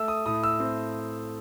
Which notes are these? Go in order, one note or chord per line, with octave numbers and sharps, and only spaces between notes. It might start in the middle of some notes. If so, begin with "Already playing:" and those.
Already playing: A3 E6
D#6
A2 D#6
E6
C4